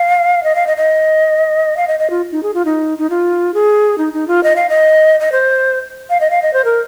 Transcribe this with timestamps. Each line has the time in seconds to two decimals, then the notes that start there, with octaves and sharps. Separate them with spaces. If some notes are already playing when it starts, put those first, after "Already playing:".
Already playing: F5
0.44 D#5
0.55 F5
0.67 D#5
0.77 D#5
1.77 F5
1.88 D#5
1.99 D#5
2.10 F4
2.32 D#4
2.43 G#4
2.54 F4
2.65 D#4
2.98 D#4
3.10 F4
3.54 G#4
3.98 D#4
4.13 D#4
4.28 F4
4.43 D#5
4.56 F5
4.70 D#5
5.20 D#5
5.32 C5
6.10 F5
6.21 D#5
6.31 F5
6.42 D#5
6.54 C5
6.65 A#4